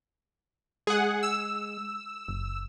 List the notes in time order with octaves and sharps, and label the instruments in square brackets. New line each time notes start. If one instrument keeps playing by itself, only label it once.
[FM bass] G#3 [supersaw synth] G#4 F#5
[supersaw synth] E6
[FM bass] F#1